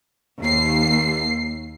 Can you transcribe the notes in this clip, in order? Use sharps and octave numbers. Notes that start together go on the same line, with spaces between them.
D#2 C7